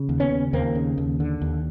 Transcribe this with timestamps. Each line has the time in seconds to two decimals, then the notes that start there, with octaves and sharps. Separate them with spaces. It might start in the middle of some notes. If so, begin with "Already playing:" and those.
Already playing: C#3
0.09 D#2
0.20 B3 C#4
0.31 C#3
0.53 D#2 A#3 C4
0.75 C#3
0.98 D#2
1.20 D3
1.41 D#2